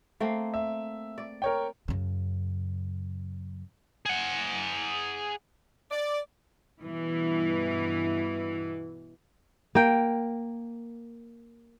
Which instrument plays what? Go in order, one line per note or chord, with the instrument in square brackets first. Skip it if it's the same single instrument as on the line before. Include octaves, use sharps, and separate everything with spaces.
[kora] A3 A#3 C4
[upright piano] E5
[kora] D5
[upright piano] A#4 C#5 G5
[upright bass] F#2 C#3
[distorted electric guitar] G#4 F#5
[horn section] D5
[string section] G2 B2 E3
[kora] A#3 G5